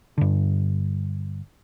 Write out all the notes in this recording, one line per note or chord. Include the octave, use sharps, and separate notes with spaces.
G2 D3